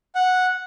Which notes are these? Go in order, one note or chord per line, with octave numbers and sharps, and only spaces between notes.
F#5